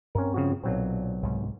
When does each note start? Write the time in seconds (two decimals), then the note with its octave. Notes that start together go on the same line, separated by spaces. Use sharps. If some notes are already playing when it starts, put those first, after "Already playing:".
0.15 G2 C4 C#4 A#4
0.34 C#3 F3 F#4
0.64 B1 A#2 F#3 C4
1.22 C2 G#2